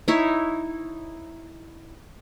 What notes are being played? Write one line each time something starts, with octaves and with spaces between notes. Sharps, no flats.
D#4 E4 C#5